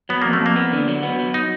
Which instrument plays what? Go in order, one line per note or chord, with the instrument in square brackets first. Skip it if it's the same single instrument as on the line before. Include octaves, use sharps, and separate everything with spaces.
[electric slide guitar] F#3 [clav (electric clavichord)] B3
[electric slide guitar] F2 [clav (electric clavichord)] A#3
[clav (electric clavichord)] A3
[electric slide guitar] F2
[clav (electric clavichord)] A#3
[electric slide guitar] B3
D3
F#3
B3
F#3
[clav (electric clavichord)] D#4